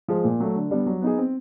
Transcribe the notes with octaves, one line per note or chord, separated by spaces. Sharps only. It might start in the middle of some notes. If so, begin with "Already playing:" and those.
F3 G#3
A#2
F#3 A3
D3
G3 B3 D4
F#3
B3 D#4 G#4
C4